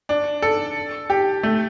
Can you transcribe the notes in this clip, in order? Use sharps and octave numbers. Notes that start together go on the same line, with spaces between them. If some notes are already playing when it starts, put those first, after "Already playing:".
D4
A4
G4
A3